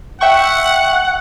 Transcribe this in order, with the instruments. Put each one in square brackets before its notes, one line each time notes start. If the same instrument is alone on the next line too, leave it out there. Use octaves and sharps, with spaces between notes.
[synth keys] E5 G5 C#6 [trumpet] F#5